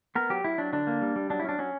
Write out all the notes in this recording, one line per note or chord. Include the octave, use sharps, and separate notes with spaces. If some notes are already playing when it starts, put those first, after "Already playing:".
B3 A#4
F#3 G4
F#3 E4
F#3 D4
D3 D4
A#3
G3
G3
F#3 D4
E4
C#4 D4
F#3 C#4